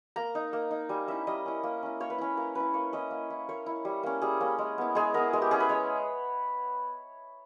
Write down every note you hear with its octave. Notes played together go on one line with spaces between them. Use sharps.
A#3 A#5
D#4
A#3
D#4
G3 G#5
C#4 E4 E5
G3 D#5
C#4 E4
A#3
C#4 E4
A#3 C#5
B4
C#4 E4
A#3 A#4
C#4 E4 B4
A#3 C#5
C#4 E4 D#5
A#3
E4
A#3 C#5
E4
G3
A#3 C#4
G3 G#4
A#3 C#4
G#3
B3 E4
G#3 G#4
B3 E4 A#4
G#3 G#4
G4
C#4 E4 G#4
B4
G#3 C#5